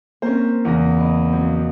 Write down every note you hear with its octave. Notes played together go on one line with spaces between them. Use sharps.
A#3 C4 C#4 C5
E2 C#3 A#6
E4 D#5
F3 F#3 C4